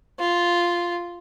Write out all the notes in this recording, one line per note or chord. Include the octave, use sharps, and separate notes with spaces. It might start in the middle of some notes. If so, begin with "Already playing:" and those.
F4